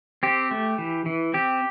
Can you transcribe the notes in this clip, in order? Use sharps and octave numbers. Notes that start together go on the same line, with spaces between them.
C4 G4
A3
E3
E3
C4 G4